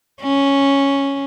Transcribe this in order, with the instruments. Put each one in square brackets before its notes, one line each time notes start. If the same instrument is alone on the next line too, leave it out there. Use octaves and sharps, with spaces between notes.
[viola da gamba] C#4